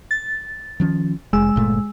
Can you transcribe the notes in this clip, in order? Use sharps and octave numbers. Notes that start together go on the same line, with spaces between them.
A6
D#3 F3 C#4
F1 G#3 E6
G1 A#2 A3